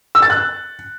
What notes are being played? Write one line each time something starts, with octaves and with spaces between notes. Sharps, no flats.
E6
A6
F#6